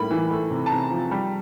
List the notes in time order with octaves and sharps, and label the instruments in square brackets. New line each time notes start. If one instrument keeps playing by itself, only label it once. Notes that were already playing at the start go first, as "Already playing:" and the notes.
Already playing: [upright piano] A2 G3 A#3 B5
E3
A3
C3
A5
C3 A#5
F3
G3